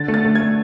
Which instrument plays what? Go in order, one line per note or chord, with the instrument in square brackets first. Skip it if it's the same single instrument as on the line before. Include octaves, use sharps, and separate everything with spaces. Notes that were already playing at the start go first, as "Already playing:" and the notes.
Already playing: [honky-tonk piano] D3 A6
A3
A6
A3
G#6
A3